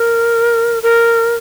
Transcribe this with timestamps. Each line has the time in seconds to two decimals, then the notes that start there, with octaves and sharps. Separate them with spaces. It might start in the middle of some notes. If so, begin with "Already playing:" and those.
Already playing: A#4
0.83 A#4